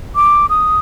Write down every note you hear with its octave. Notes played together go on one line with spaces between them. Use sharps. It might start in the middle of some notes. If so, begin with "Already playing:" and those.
D6
D#6